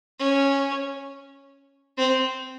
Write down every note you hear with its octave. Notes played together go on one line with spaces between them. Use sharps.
C#4
C4